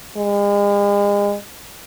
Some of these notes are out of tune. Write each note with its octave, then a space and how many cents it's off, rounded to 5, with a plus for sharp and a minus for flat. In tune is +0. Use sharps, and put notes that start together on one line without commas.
G#3 -40